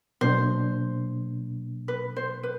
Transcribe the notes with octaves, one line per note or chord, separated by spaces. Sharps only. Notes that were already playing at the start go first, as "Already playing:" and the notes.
B2 F#3 A#3 D4 C5
B4
C5
B4